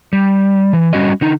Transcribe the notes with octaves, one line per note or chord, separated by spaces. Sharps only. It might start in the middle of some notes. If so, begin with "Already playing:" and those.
G3
E3
G3 C#4 F#4 D#5
D3 D#4